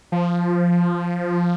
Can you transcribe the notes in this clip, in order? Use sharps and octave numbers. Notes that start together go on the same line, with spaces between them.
F3